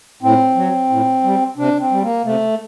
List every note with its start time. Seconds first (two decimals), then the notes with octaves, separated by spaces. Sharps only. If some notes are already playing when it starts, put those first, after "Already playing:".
0.22 A2 C4
0.56 F#3
0.90 A2
1.24 G3
1.57 C3 D4
1.80 C4
1.91 G3
2.02 A#3
2.24 C3 A3